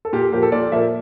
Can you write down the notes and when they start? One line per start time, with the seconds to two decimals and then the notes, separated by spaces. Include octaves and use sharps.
0.05 A4
0.13 A#2 G4
0.32 F3 A#3 G4
0.42 A4
0.52 A#2 D5
0.72 F3 A#3 E5